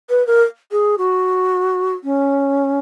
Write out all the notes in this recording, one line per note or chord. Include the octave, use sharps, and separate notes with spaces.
B4
A#4
G#4
F#4
C#4